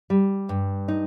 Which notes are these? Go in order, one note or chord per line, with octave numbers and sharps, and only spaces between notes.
G3
G2
D#4